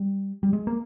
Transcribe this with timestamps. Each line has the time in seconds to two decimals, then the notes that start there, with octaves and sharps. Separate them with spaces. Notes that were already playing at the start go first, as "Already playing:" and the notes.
Already playing: G3
0.43 G3
0.53 G#3
0.67 A#3